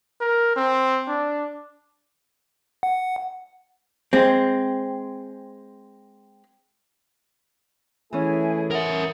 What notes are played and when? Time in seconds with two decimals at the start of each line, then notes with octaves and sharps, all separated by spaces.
0.21 A#4
0.56 C4
1.08 D4
2.83 F#5
4.13 G#3 C4
8.13 E3 A3 C#4 E4 G#4 C#5 E5 G#5
8.71 A#4 E5 F#5 D#6